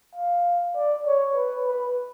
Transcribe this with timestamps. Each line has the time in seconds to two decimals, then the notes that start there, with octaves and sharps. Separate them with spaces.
0.15 F5
0.76 D5
1.07 C#5
1.36 B4
1.67 B4